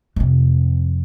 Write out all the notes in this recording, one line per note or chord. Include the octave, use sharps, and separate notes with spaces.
F2 C3